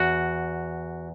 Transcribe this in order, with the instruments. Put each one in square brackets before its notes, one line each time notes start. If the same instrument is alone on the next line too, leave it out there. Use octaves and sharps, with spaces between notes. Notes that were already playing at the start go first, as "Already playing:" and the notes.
Already playing: [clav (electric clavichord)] E2 F#4